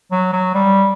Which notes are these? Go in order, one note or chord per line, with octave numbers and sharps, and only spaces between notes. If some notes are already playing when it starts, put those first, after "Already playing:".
F#3
F#3
G3